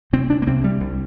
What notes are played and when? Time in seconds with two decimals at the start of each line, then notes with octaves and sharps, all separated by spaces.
0.13 C3 C4
0.30 D4
0.42 A#3
0.46 C2 C4
0.64 G3
0.80 C2